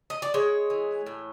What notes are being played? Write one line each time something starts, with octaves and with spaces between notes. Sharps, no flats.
D#5
D5
G#3 C#5
E3
A2